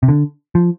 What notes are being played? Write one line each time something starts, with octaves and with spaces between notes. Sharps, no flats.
C3
D3
F3